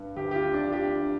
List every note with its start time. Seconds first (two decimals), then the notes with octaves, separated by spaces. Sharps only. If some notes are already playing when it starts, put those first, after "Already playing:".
Already playing: G2
0.16 D2 G4
0.31 G4
0.35 F4
0.45 D3
0.54 D4
0.72 D3 G4